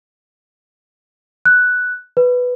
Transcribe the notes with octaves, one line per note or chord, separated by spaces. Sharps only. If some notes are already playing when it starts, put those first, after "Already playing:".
F#6
B4